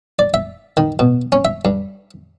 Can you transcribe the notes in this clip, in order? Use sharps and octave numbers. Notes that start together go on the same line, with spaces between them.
D5
E5
D#3
B2
C#4
E5
G2